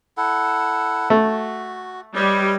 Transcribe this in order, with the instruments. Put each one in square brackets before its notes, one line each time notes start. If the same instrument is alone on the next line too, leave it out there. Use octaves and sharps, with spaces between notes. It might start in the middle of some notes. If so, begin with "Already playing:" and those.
[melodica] E4 A4 F#5
[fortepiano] A3 [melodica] F#4
[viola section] G3 [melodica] B4 C#5 D#5